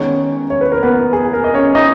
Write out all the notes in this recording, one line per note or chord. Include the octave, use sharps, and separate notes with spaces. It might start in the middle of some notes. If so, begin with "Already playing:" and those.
Already playing: D#3 G#3 B3 C#4 D#4 C#5
C#5
B4
A#4
B3 B4
G#4
A#4
D#5
C#4 C#5
D#4 D#5